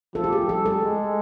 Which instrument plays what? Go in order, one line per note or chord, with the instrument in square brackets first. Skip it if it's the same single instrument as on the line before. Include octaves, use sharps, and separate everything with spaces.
[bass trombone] F3 [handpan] A4
[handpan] G4
G#4
[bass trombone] G3 [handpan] A4
[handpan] A4
[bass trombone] G#3